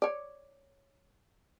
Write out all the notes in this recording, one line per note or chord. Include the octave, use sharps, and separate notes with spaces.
C#5 D5